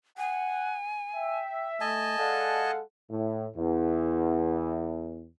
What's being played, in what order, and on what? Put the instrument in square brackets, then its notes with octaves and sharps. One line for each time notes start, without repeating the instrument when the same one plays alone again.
[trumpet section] F#5 [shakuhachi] G#5
[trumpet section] E5 [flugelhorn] G5
[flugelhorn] A3 [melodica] D#5 G#5 A5
[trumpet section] G#3 F5 F#5 [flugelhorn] A4 [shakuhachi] D5
[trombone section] A2
E2